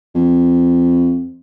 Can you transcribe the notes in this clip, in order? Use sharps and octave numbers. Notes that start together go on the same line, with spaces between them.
F2